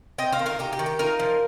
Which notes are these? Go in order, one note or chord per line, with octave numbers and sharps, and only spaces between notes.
C4 D#5 G5
C5 F5
D#3
F4 A#4
D#4 G4
G4
D#3
G4
D#4 F4 A#4
F3